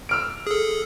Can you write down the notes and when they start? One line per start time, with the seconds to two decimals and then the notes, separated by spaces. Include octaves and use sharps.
0.09 E6 F6 D7
0.47 G#4 A4